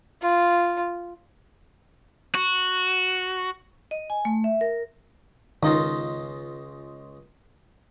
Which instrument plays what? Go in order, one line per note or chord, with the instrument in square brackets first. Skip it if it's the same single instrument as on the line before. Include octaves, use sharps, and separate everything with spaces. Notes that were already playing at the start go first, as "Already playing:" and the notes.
[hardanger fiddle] F4
[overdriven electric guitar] F#4
[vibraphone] D#5
G#5
A3
E5
A#4
[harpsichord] C#2 D#4 F4 [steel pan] D#3